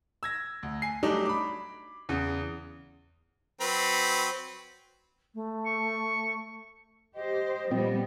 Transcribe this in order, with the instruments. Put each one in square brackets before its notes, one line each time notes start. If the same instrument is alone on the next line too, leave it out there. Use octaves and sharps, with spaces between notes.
[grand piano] E6 G#6 A#6
D2
G#5 C7
F#3 G3 A3 D4 D#4
B5 D6
E2 C#3
[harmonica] F#3 C4 B4
[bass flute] A3
[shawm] C#6
[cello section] G4 C5 [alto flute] D#5
[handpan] A#2 C4 [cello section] F3 G3 B3